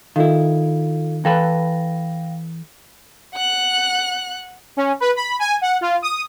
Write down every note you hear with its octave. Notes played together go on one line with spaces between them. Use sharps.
D#3 E4 F4 A4 F5
E3 A4 B4 F5 G5 A#6
F#5 F#6
C#4
B4
B5
G#5
F#5
F4
D#6